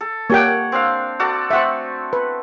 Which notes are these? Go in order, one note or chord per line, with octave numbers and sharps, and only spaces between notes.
A4
A#3 G4 C#5 F#5 G5
C4 D4 F5
F#4 A4 D5
A3 C4 E5 F#5
B4